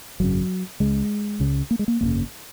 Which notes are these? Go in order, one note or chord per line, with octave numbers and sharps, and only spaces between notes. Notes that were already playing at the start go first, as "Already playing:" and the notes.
G#1 F#2 C#3 F#3
C#2 C#3 G#3
C#2 C#3
A#3
G#3
A#3
G#1 F#2 C#3 A#3